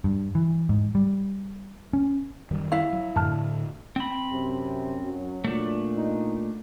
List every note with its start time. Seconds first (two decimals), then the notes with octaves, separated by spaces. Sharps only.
0.04 G2
0.35 E3
0.69 G#2
0.95 G3
1.93 C#4
2.51 F#2 D#3 G3
2.72 E4 F5
2.93 F#3
3.16 F#2 A2 D3 A5 F6
3.96 C4 B5
4.32 F#2 C3
5.05 F#3
5.44 A#2 A3 D4
5.97 D#4